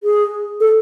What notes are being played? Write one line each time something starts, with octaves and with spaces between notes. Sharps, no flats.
G#4
A4